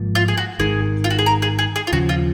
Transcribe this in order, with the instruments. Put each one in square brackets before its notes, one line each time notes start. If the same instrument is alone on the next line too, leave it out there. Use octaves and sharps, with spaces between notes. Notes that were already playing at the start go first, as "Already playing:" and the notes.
Already playing: [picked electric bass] G#1 G#2 F3 A#3
[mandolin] F4
G#4
F#4
[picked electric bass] G#1 G#2 D#3 [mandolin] G#4
[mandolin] F4
F#4
G#4
A#4
G#4
G#4
G#4
F4
[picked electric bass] D#2 C#3 F3 [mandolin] F#4
[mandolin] F4